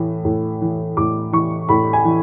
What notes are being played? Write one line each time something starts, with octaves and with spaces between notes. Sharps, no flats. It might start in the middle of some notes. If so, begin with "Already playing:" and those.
Already playing: A2 E3
A2
E3
A2 D6
E3 C#6
A2 B5
G#5
E3